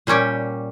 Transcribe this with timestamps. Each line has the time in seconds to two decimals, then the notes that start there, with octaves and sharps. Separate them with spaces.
0.07 A#2 G3 C#4 G4